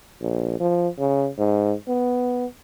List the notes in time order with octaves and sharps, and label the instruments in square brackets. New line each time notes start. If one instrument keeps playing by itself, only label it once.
[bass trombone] A#1
F3
C#3
G#2
B3